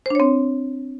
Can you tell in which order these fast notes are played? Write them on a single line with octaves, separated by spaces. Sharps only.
C5 D4 C#5 C4